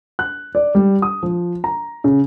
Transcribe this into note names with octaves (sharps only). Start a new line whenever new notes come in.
F#6
D5
G3
D#6
F3
A#5
C#3